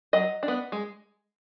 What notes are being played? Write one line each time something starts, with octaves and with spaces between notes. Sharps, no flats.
F#3 D#5
D4
B3
G#3